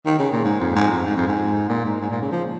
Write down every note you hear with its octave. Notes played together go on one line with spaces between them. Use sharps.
D#3
C#3
A#2
G#2
F2
G#2
F2
G#2
F2
G#2
A#2
G#2
G#2
A#2
C#3
F3